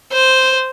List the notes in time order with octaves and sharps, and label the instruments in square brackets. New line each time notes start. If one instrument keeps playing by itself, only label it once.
[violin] C5